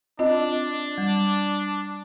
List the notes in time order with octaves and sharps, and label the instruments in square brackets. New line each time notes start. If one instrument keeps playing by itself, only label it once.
[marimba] C4 F4 D#5 [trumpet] D4
[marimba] G3